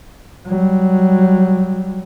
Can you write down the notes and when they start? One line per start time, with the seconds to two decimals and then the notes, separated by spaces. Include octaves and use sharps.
0.47 F#3 G3